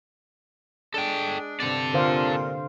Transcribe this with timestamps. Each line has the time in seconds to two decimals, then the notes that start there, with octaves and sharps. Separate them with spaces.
0.94 G#3 D4 A4 G5
1.60 G2 C3 C4 A4 D5
1.94 A#2 D3 C5 F5